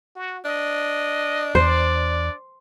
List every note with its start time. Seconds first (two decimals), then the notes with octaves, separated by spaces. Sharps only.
0.16 F#4
0.45 D4 D#5
1.55 E2 C5 D5